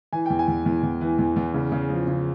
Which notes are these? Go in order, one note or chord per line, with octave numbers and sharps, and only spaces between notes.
E3 G#5
E2 G5
G#5
E2
E2
E2
E3
E2
E2
C#3
C#3
F3
C#3